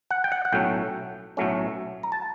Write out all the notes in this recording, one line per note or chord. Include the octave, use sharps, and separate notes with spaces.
F#5
G5
F#5
F#5
B1 A2 F#3 A3 C#4 G5
B1 A2 F#3 A3 C#4
A#5
A5